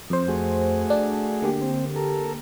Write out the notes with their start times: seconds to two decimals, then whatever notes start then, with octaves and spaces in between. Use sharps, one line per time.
0.10 F2 C5
0.28 A3 F#4 G#4
0.90 D4
1.42 D3 A#3 G4
1.61 C4
1.96 A4 A#4